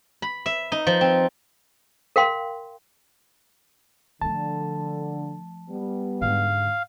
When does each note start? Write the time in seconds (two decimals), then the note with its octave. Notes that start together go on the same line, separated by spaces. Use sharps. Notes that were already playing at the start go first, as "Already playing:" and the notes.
0.22 B5
0.46 E5
0.72 D#4
0.87 F3
1.01 C4
2.16 A#4 F5 G5 C6
4.22 D3 F3 A3 A5
5.70 G3 B3
6.21 G#2 D3 F5